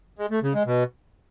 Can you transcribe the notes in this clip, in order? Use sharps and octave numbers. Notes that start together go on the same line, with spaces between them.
G#3
A3
C#3
G#3
B2